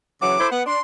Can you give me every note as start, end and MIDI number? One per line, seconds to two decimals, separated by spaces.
0.21 0.38 49
0.21 0.38 52
0.21 0.38 54
0.21 0.50 86
0.39 0.49 64
0.39 0.49 69
0.39 0.49 72
0.51 0.62 59
0.51 0.63 78
0.66 0.80 62
0.66 0.81 84